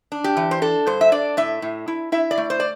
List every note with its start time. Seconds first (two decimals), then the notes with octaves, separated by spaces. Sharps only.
0.12 D4
0.24 G4
0.37 E3
0.51 C5
0.62 D4 A4
0.87 G2 C5
1.01 E5
1.12 D4 D5
1.37 A2 E5
1.62 A2
1.88 E4
2.12 E4 E5
2.31 D5
2.38 A3
2.50 C5
2.60 D5